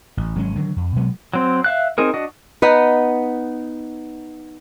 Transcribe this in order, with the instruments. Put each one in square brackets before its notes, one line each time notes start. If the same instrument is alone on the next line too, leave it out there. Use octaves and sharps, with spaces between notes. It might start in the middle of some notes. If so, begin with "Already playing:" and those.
[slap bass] A1
G#1 F#3 G#3 C#4
D3 D#3 F#3
F2
B2 F#3 G#3 B3
[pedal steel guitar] F#3 C4
E5 F5 F#6
C4 D#4 G#4 A#4
D4 F#4 D#5
[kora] B3 D#4 B4